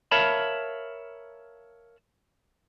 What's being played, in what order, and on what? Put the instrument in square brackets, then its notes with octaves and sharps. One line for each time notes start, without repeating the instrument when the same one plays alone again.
[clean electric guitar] A#4 C#5 E5 F5 A5 B5